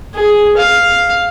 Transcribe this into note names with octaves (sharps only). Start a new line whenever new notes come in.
G#4
F5